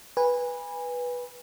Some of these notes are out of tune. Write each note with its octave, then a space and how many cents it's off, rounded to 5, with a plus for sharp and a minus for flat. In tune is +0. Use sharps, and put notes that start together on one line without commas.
B4 -10 G#5 -25